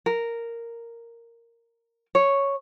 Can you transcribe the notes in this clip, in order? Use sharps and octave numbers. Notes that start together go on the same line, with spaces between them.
A#4
C#5